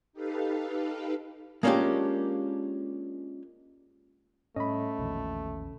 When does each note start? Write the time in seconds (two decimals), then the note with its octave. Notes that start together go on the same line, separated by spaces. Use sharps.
0.13 D#4 G4 A4 B4 F5
1.63 G#3 A#3 C#4 D4 F4 G4
4.56 A2 G3 A3 C#4 D#5 B5
4.99 A#1 E2 B2 D#3